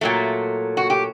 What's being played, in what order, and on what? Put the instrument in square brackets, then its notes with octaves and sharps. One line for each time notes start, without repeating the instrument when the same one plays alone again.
[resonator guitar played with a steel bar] A#2 F#3 A3
F#4
G4